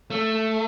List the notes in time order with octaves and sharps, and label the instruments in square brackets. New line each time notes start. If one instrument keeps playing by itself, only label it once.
[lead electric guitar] A3